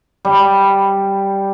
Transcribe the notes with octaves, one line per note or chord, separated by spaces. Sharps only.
G3